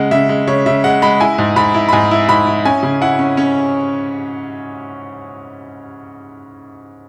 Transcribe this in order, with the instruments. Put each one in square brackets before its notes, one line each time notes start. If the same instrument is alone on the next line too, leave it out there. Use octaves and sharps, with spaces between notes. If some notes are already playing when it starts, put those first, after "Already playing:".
Already playing: [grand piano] C#3 G#3 F#5
C#3 E5
G#3
C#3 C#5
C#3 E5
G#3 F#5
G#3 B5
E4 G#5
G#2
G#2 B5
E4
B5
G#2 G#5
E4
G#2 B5
E4
C#4 G#5
C#3
E4 F#5
C#4
C#4 C#5